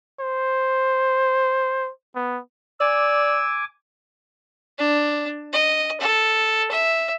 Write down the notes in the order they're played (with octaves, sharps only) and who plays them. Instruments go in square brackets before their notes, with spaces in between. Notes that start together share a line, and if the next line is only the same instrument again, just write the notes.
[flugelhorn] C5
B3
[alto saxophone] D5 [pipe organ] G#5 D6 [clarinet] E6
[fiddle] D4
D#5
A4
E5